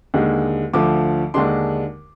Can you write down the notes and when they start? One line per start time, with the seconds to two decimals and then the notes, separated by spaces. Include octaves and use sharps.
0.14 D#2 D3 G#3
0.74 D2 D3 F3 D6
1.34 D#2 D3 G#3 D4 C6